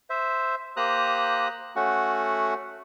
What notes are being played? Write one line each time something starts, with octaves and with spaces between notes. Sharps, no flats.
C5 E5
A#3 G4 C5 A#5 D#6 F#6
A3 C#4 F#4 F#5